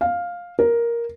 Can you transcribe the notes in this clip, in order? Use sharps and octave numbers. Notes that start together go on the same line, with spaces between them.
F5
A#4